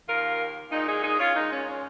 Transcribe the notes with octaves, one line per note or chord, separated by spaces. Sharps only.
D#2 D#3 A#3 F4 A#4
A#2 G#3 D#4
D#4 G#4
D#4 G#4
C#4 F4
A#2 G#3 D#4
C#4
C#4